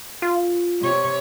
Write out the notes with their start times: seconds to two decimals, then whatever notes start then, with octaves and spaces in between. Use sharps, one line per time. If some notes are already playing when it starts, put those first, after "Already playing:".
0.22 F4
0.81 C3 C#5